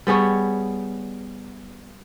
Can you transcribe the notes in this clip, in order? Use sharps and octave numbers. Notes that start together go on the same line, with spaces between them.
G3 B3 G#4 C#5